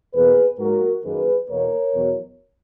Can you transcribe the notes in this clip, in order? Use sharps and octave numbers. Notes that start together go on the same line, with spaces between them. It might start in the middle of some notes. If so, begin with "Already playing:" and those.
E2 B2 A#3 G#4 B4
G#2 F#3 A#3 F#4 A#4
F#2 D#3 A#3 G#4 B4
E2 B2 A#3 A#4 C#5
E2 B2 F#3